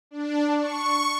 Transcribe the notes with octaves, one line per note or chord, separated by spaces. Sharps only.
D4
C#6